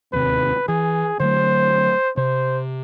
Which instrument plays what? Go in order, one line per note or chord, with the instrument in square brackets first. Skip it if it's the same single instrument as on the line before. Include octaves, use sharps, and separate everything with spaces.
[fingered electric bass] D1 D#2 C3 [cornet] B4
[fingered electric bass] E3 [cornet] G#4
[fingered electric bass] D3 F#3 A3 [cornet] C5
[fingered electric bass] C3 [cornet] C5